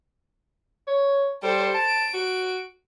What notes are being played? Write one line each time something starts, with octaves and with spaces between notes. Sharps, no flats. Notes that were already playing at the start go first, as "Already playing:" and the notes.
C#5
G3 A4 C5
A5 D7
F#4